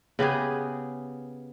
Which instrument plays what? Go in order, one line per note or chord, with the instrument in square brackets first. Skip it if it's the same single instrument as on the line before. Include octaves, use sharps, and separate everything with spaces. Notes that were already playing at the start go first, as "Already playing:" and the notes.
[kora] C#3 B3 G4 G#4